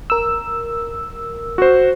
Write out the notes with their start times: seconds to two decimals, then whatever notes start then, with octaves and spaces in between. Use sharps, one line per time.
0.10 A#4 E6
1.58 F#4 C5